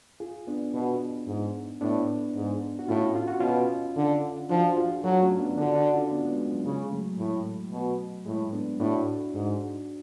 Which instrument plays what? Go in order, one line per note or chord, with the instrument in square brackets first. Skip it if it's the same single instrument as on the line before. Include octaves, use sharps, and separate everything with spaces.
[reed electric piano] F4 G#4
B3 D4
[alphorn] B2
G#2
[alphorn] A2 [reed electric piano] B3 D4
[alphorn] G#2
[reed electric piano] F#4
[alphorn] A2 [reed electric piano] C#4 F4
[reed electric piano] F4
F#4
[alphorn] B2 [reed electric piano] C#4 F4
[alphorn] D3
[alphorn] F3 [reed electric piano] D4 F#4
[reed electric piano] F4 G#4
[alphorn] F#3 [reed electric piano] F#4 A4
[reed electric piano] A3 C#4
B3 D4
[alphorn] D3 [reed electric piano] D4 F#4
[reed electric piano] D4 F#4
C#4 F4
B3 D4
G#3 B3
G#3
F#3
[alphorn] C#3 [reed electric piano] G#3
[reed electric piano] F#3 A3
[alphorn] A2
B2
[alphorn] A2 [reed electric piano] G#3
[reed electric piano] B3 D4
[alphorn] A2 [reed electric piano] D4 F#4
[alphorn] G#2